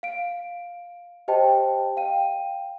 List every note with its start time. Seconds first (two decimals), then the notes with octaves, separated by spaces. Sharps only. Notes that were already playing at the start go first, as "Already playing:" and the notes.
0.03 F5 D7
1.28 G4 C5 D#5 G5 A5
1.97 F5 G5 D#7